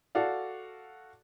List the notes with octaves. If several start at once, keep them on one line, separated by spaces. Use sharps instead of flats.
F#4 A4 D5 F5